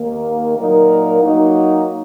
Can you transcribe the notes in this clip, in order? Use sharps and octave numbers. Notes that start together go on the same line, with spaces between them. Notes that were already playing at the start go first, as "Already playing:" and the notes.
Already playing: D#2 D#3 A#3
A#2 F#3 A#3 D#4 A#4
F#3 A#3 D#4